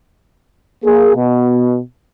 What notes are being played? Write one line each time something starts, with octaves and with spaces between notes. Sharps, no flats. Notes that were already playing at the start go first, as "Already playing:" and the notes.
A#3 G#4
B2